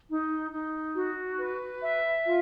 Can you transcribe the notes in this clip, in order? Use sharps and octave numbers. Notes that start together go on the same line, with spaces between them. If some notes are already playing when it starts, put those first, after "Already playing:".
D#4
D#4
F#4
B4
E5
F4